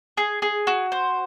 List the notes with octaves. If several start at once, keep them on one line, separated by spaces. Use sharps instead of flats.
G#4
G#4
F#4
C5